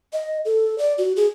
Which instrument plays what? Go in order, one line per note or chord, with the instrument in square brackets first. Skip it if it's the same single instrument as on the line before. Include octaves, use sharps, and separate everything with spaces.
[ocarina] D#5
A4
D5
F#4
G#4